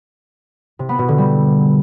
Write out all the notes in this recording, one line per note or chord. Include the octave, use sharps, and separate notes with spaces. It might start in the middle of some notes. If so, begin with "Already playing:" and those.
C3
B3
B2
D3
G3